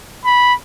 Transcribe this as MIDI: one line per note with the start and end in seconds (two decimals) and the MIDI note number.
0.25 0.54 83